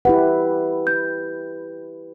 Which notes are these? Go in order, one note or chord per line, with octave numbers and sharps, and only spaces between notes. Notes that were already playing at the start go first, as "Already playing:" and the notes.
E4 G4 B4 F#5
G6